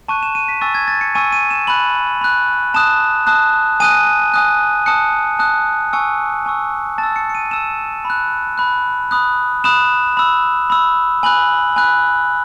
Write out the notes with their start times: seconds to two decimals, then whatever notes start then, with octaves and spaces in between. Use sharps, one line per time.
0.08 A5 C#6 F#6 D#7
0.23 E7
0.35 D#7
0.48 B6
0.61 G#5 C#6 E6 A6
0.75 G#6
0.88 A6
1.01 C#7
1.15 G#5 C#6 E6 D#7
1.32 D#7
1.51 E7
1.67 B5 F#6 F#7
2.21 B5 F#6
2.74 A5 D#6 F#6 E7
3.27 A5 D#6 F#6
3.80 G#5 D#6 F#6 D#7
4.34 G#5 D#6 F#6
4.86 A5 D#6 F#6 C#7
5.39 A5 D#6 F#6
5.93 G#5 C#6 E6 C#7
6.46 G#5 C#6 E6
6.98 A5 A6
7.03 E6
7.16 C#7
7.30 C#7
7.35 D#7
7.51 A5 E6 E7
8.05 B5
8.10 F#6
8.58 B5 F#6
9.11 B5 D#6 F#6
9.64 B5 D#6 F#6 E7
10.17 B5 E6
10.70 B5 E6
11.23 G#5 B5 F#6 F#7
11.76 G#5 B5 F#6